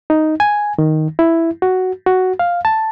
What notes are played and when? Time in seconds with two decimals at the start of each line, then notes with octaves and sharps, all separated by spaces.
0.10 D#4
0.40 G#5
0.79 D#3
1.19 E4
1.62 F#4
2.07 F#4
2.39 F5
2.65 A5